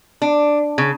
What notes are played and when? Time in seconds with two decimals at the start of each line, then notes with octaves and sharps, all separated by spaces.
0.22 D4
0.78 C#3